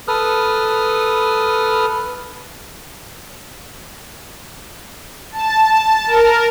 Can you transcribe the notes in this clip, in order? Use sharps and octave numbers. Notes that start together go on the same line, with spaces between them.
A4 B4 D#6 F6
A5
A#4